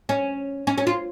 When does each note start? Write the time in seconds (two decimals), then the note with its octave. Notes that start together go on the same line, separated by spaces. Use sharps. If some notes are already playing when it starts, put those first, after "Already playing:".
0.09 C#4
0.67 C#4
0.78 C#4
0.87 F4